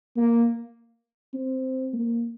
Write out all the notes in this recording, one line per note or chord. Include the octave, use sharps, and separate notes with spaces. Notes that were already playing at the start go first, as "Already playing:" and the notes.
A#3
C4
A#3